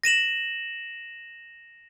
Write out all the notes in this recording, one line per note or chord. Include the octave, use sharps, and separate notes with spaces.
A#6 D#7 E7 F#7